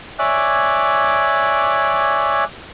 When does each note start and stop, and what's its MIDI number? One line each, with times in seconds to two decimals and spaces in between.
0.19 2.44 73
0.19 2.44 74
0.19 2.44 76
0.19 2.44 80
0.19 2.44 86
0.19 2.44 90